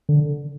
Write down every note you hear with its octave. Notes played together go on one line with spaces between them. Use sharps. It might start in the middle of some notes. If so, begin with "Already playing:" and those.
D3